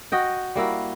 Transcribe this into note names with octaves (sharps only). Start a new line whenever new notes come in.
F#4 D#5 G5
G3 A#3 E4 F#4